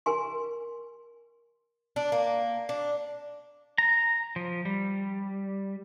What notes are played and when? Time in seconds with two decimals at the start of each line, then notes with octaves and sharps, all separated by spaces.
0.06 A#4 G#5 C6
1.96 D4
2.12 A#3
2.69 D4
3.78 A#5
4.36 F3
4.65 G3